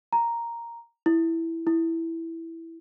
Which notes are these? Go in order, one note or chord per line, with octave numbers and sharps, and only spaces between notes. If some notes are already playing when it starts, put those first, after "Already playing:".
A#5
E4
E4